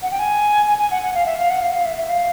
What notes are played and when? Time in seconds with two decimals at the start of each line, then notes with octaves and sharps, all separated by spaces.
0.02 F#5
0.11 G5
0.19 G#5
0.67 G#5
0.78 G#5
0.91 F#5
1.02 F#5
1.14 F5
1.26 E5
1.38 F5
1.50 F#5
1.62 F5
1.73 F5
1.85 E5
1.98 E5
2.09 F5